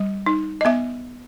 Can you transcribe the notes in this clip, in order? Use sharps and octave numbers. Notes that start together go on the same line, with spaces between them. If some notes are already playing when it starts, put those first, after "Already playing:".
Already playing: G3
D#4
D#5
B3 E5